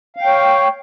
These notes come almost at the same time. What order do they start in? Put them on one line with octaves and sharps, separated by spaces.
F5 G5 C#5